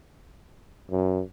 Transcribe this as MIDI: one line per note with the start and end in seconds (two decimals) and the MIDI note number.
0.91 1.22 42